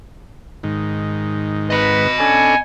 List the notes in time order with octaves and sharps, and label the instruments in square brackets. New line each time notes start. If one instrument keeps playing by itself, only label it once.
[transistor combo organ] G#2 D#3
[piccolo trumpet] B4 [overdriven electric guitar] D#5 B5
[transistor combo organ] C#4 D4 A4 [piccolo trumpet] G#5